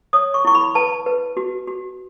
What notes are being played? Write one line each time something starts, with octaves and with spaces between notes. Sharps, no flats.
C#5 D#6
C#6
E4 C#6
B5
B4 A5
B4
F#4
F#4